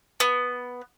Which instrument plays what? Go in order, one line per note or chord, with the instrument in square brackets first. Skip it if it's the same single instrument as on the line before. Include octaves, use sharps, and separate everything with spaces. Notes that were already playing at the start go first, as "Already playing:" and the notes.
[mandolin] B3